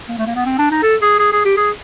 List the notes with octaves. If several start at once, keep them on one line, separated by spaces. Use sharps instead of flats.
A#3
A3
A#3
B3
C4
D4
D#4
A4
G#4
G#4
G#4
G4
G#4